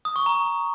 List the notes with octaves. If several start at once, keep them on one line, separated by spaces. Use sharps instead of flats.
D#6
C#6
A#5